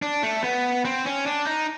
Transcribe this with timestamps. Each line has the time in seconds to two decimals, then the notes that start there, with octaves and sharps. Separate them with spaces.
0.02 D4
0.23 A3
0.43 B3
0.85 C4
1.06 C#4
1.26 D4
1.47 D#4